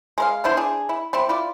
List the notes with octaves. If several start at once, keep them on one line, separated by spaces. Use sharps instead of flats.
G#3 A#4 F5
B3 D4 E4 C5
D4 G#4
E4
G3 C4 E4
E4 F4 D5